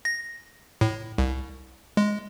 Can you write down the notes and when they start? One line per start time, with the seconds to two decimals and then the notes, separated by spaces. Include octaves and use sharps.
0.05 A#6
0.81 A2
1.18 C2
1.97 G#3